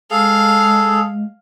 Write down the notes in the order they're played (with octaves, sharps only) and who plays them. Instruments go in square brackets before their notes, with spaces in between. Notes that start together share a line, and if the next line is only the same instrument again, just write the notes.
[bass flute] G#3 [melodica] G#4 A4 [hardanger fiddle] F5